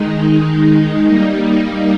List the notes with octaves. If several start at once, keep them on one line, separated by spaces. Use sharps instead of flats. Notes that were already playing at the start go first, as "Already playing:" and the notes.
Already playing: D#3 G#3 D#4
G3 A#3 D#4